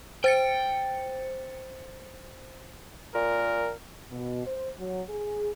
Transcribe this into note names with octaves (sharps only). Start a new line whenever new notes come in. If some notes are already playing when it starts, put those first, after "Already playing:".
C5 G5 A6 C#7
A#2 A#4
B2
C5
F#3
G#4